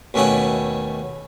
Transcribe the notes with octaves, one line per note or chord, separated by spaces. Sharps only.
D#2 B2 A3 C#4 E4 F#5